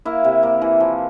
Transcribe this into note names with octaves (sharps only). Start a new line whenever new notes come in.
A#3 E4
C3
A#3
E3
F3